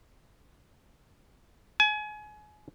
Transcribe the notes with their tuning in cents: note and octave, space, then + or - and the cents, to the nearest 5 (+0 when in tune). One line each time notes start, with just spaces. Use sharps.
G#5 +30